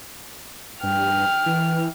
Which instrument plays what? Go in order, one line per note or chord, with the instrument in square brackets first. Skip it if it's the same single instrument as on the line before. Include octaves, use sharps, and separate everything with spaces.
[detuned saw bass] G2 [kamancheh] G5 F6
[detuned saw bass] E3